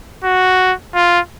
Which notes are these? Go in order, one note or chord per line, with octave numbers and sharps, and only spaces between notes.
F#4
F4